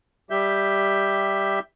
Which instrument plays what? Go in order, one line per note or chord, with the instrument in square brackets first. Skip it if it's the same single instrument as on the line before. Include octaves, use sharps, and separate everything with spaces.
[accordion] G3 G4 E5 G6